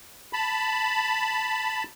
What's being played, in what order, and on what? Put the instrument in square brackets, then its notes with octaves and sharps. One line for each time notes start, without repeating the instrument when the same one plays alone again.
[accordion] A5 B5